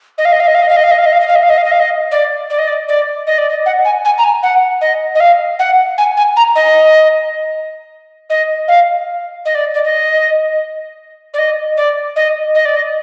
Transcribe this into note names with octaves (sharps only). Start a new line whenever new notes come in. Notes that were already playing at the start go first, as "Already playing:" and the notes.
D#5
F5
D#5
F5
D#5
F5
D#5
F5
D#5
F5
D#5
F5
D#5
F5
D#5
F5
D#5
F5
D#5
F5
D#5
F5
D#5
D5
D5
D#5
D5
D5
D#5
D5
D#5
F#5
G#5
G#5
A#5
G#5
F#5
D#5
D#5
F5
F#5
G#5
G#5
A#5
D#5
D#5
F5
D#5
D5
D5
D#5
D5
D#5
D5
D#5
D#5
D5
D#5